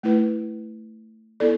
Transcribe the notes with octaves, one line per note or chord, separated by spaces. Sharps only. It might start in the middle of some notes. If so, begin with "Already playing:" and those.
A3 E4 B4
B3 E4 A4 D5